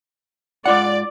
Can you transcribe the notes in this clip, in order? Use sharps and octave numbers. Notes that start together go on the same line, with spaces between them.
G#2 F4 D5 F#5